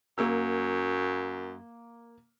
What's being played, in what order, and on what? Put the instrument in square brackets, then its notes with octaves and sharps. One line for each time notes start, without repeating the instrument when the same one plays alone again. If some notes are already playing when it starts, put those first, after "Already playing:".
[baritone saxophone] F#2 [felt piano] A#3 E6